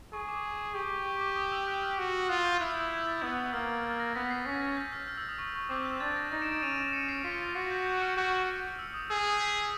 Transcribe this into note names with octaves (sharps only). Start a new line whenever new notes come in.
G#4 C#6
D6
G4 C#6
C#6
C#6
D6
D#6
E6
F#6
F6
F#4
F4 D#6
G6
E4 F#6
G6
G#6
A6
B3 E6
E6
A#3 F6
A6
A#6
B3 B6
C7
C#4 B6
A6
G6
F6
F6
E6
D#6
C#6
C#6
C4 D6
G6
D4 A6
A#6
D#4 A#6
D7 E7
D7 E7
C#4 D#7 F7
D7 E7
C#7 D#7
C7 D7
F4 B6 C#7
F#4 C7
G6
G6
F6
F#4
E6
D#6
G#4 E6
B6